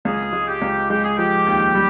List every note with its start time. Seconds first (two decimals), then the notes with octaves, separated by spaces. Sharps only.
0.05 C#2 G#4
0.33 G#3
0.47 G4
0.62 C#2
0.90 G#3 G4
1.04 G#4
1.17 F3 G4
1.47 D#2
1.75 G3